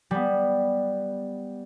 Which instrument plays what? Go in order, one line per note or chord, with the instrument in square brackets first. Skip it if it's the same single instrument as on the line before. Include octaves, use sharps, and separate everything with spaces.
[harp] G3 B3